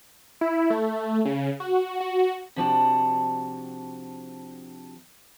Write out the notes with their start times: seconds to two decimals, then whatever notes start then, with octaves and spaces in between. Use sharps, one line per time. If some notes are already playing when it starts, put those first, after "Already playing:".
0.41 E4
0.70 A3
1.25 C#3
1.60 F#4
2.00 F#4
2.56 C3 F3 D4 F#4 G5 A5